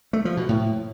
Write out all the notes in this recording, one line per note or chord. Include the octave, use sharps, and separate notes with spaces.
A3
F3
B2
A2